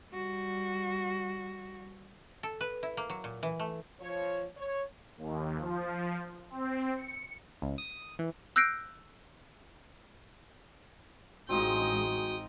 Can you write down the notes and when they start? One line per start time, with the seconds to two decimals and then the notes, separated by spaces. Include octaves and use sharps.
0.12 G3 F#4
2.43 A4
2.61 B4
2.83 E4
2.97 A#3
3.10 F#3
3.24 A#2
3.43 E3
3.59 A3
4.00 F3 C#5
4.57 C#5
5.18 D#2
5.58 F3
6.50 C4
6.97 C#7
7.62 C#2
7.78 D#6
8.19 E3
8.56 E6 F#6 G6 A#6 C7 D7
11.49 A1 G#3 C4 D#4 F4 F#4 G5 D#6